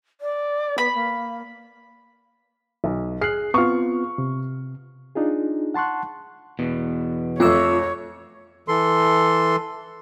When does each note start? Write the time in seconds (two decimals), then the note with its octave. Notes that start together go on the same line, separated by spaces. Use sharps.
0.21 D5
0.78 B3 B5
0.94 A#3
2.84 B1
3.21 G#4 F6 F#6 C7
3.54 B3 C4 F4 C#6 F6
4.18 C3
5.15 D4 D#4 F4 G#4
5.74 F#5 A5 C6 C#6 F#6
6.59 E2 B2
7.40 F2 A3 F4 C#5 D6 E6
8.68 E3 A4 C6